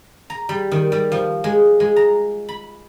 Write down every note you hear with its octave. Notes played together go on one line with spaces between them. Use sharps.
A#5
G3
D#3
G3
F3
G#3
G#3
A#5
B5